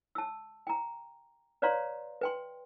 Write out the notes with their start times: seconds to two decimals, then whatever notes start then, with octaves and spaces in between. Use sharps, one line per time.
0.15 A5 E6
0.67 G5 A#5
1.62 B4 C#5 D5 F5 A#5 C6
2.21 B4 G5 C6